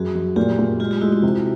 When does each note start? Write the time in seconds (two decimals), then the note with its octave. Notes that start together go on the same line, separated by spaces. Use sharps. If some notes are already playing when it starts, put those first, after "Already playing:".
Already playing: F#2 F#4 G#4
0.15 F#2
0.36 A#2 F4 G4
0.59 A#2
0.80 G#3 F4 G4
0.91 F4 G4
1.01 G#3 E4 F#4
1.12 E4
1.23 C3